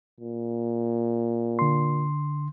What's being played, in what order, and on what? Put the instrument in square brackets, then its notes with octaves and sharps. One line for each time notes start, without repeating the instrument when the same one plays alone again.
[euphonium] A#2
[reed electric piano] D3 C6